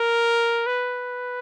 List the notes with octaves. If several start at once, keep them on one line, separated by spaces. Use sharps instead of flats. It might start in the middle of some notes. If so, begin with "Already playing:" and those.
Already playing: A#4
B4